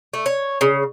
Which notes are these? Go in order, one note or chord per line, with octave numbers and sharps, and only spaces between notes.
A3
C#5
C#3